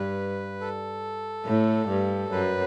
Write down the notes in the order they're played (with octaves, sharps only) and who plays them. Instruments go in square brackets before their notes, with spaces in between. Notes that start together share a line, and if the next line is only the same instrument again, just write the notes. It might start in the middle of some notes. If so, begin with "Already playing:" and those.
Already playing: [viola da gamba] G2 [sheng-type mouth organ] B4
[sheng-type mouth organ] A4
[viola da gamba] A2
G2
[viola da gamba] F#2 [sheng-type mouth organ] B4